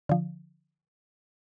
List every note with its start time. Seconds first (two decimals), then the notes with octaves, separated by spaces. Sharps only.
0.09 D3 F3